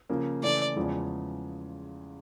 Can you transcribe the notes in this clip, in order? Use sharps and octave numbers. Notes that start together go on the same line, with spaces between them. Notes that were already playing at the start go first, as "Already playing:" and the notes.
C#3 F3 A#3
C#3 E3 A3 D5
E2 C#3 F3 G#3